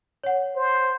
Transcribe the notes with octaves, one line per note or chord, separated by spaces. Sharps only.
C#5 F#5
C5